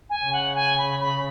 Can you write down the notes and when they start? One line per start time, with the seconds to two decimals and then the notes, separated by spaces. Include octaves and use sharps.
0.09 G#5
0.24 C#3
0.32 F#5
0.55 G#5
0.77 B5
1.00 B5